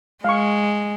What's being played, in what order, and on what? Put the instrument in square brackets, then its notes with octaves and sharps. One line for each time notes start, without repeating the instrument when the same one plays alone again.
[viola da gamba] G#3 [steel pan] F5 C#6